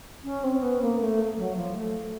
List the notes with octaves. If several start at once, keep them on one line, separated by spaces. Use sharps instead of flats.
C#4
C4
B3
A#3
A3
F#3
F3
A3